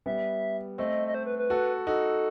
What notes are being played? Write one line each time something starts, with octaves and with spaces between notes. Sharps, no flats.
G3 B3 E5
A3 C4 D#5
D#5
C5
B4
B4
F#4 A4
D#4 F#4 A4